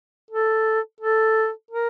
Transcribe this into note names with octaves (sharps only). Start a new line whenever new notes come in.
A4
A4
A#4